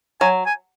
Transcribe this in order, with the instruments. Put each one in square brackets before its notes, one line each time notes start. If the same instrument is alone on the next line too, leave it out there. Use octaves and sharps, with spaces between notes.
[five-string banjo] F#3 [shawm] G#5
[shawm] G#5